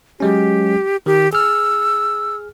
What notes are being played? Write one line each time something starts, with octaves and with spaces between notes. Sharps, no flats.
F#3 G#3 C#4 G4
D#3 G4
G#4 E6 F6